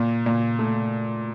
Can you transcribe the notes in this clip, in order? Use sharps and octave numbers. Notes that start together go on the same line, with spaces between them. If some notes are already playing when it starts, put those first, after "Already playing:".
Already playing: A#2
A#2
A3